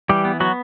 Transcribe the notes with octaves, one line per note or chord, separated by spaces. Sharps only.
E3 G3 G4
B3
F#3 B3 F#4